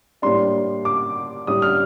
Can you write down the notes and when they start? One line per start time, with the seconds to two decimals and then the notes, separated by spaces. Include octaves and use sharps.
0.22 A2 G3 A#3 D4 C6
0.85 D6
1.47 A2 G3 D4 D#6
1.62 F6